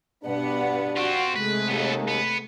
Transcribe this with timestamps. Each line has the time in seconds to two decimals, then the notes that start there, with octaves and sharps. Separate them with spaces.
0.24 G2 B2 B3 D4 F#5
0.96 C4 F4 F#4
1.36 C3 G#3 A3 B4
1.68 D#2 B3 A4
2.08 B3